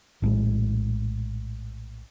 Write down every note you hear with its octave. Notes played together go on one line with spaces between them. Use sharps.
A#1 A2 F3 G#3